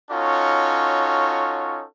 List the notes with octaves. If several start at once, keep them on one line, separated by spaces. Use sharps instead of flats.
C#4 D#4 F4 F#4 A4 C#5